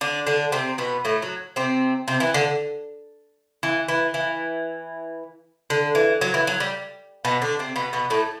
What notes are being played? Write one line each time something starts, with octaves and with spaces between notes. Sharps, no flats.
D3 D4
D3 D4
C3 C4
B2 B3
A2 A3
F#3
C3 C4
C3 C4
E3
D3
E3
E3
E3
D3
E3
F#3
E3
F#3
G3
B2 B3
D3 D4
C3 C4
B2 B3
B2 B3
A2 A3